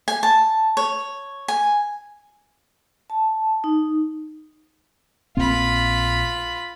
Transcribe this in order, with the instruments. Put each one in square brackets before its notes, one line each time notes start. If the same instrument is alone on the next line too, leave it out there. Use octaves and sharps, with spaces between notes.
[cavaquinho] G#5
A5
C#5
G#5
[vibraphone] A5
D#4
[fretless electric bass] A#1 A#2 C4 [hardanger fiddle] F4 B5